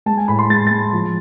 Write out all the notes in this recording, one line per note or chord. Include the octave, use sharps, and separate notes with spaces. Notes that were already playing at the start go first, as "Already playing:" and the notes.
G#3 A5
G#5
A2 B5
C6
G#3 A6
G#3 A6
F3